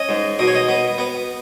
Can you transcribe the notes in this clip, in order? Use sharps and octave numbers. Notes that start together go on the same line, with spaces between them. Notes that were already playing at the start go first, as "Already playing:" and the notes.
Already playing: C#4 D#5
G#2
B2 D#5
C#5
D#5
B3
B3